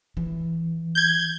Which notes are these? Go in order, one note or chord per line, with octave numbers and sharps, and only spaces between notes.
E3
G6 G#6